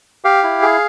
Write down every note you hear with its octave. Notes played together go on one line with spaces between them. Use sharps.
G4 F5
E4
G#4